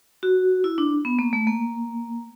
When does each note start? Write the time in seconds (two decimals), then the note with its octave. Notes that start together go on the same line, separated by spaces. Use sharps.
0.23 F#4
0.64 E4
0.78 D4
1.05 B3
1.19 A#3
1.33 A3
1.47 A#3